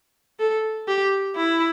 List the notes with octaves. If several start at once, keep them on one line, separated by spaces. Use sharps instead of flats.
A4
G4
E4